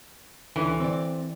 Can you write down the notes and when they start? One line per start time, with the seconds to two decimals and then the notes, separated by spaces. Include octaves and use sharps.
0.56 D2 D3 E3 C#4
0.80 C4 D5